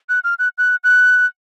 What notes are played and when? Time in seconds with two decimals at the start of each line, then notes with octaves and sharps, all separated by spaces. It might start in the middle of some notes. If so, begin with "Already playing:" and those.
0.09 F#6
0.24 F6
0.39 F#6
0.58 F#6
0.84 F#6